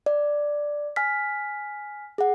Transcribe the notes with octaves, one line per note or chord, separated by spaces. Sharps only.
D5
G#5 F6 B6
G#4 F#5